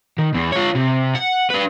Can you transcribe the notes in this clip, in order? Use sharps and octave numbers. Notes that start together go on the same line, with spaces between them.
D#3
E2
F4 C#5
C3
F#5
D4 B4